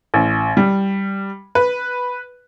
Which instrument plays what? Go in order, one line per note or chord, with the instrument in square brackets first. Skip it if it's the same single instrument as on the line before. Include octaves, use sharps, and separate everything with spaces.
[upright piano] A1
G3
B4